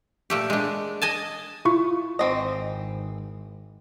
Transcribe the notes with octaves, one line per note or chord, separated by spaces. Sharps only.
A#2 A3 G4
G#3 D4
D#5 G#5 A5
E4 F4 C#6
G#1 E3 C4 D#5